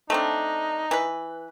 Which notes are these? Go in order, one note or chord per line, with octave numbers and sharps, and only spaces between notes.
A3 C4 D4 D#4
E3 B4